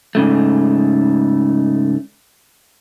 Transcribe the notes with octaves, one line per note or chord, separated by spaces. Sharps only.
G#2 C#3 A3